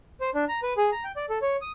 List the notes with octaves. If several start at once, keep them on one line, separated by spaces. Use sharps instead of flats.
C5
D4
A#5
B4
G#4
A#5
G5
D5
A4
C#5
D#6